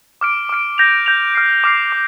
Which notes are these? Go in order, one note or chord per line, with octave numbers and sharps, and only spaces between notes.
D6 F6 D7
D6 F6 D7
G6 A#6 F7
G6 A#6 F7
D6 F6 C7
D6 F6 C7
D6